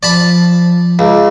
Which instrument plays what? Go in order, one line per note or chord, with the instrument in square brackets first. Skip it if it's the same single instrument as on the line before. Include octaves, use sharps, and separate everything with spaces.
[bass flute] F3 [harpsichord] D5 A5 B5
[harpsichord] C#2